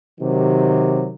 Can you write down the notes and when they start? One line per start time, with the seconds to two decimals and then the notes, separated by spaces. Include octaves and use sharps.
0.20 C3 D#3 F#3 G4